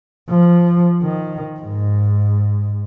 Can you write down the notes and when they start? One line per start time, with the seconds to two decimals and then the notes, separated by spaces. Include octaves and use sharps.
0.30 F3
1.03 D#3
1.60 G#2